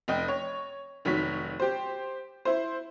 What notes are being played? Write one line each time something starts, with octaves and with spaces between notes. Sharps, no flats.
F1 D#5 G5
C#5
F1 D#3 F#3 C#5 B6
G4 C5
E4 C5